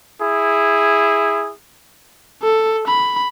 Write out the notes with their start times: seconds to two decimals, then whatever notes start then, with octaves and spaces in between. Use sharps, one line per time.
0.21 E4 G#4
2.42 A4
2.88 B5